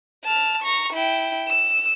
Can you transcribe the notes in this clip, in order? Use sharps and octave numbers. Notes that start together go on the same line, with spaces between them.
A5 F6
A#5 C#6
E4 G5
E6